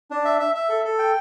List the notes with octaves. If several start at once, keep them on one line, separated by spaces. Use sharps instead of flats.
D4
E5
E5
E5
A4
A4
G5